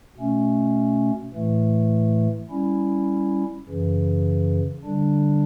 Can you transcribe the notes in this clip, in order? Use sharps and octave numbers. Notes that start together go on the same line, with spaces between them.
B2 A3 C#4
A2 E3 A3
G3 C#4 E4
F#2 C#3 E3
D3 G3 D4